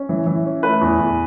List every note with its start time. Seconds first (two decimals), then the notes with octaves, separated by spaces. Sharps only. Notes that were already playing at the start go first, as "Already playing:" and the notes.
Already playing: C#4
0.09 E3
0.27 E3
0.45 C#4
0.63 A3 B4
0.81 E2
0.99 E2